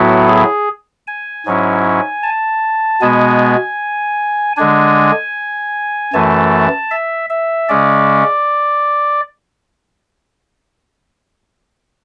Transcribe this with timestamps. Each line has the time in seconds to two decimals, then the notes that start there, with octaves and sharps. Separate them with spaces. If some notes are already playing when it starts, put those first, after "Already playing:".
Already playing: A2 F#3 B3 E4 F#4
0.28 G#4
1.07 G#5
1.46 G#2 F#3 C#4 E4
2.23 A5
3.01 B2 G#3 B3 G#5
4.57 D3 G#3 D4 G#5
6.13 F#2 E3 A3 A5
6.91 E5
7.30 E5
7.69 C#3 G#3 C#4 D5